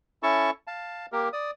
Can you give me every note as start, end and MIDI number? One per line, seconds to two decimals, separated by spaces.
0.23 0.51 61
0.23 0.51 64
0.23 0.51 69
0.23 0.51 81
0.23 0.51 85
0.67 1.06 77
0.67 1.06 81
1.12 1.29 58
1.12 1.29 67
1.12 1.29 70
1.33 1.51 74
1.33 1.51 87